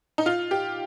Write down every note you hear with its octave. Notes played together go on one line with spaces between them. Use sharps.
D#4
F4
G4